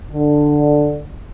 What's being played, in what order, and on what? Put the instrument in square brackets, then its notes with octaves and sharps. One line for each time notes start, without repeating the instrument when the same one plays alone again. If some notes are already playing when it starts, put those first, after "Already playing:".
[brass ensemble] D3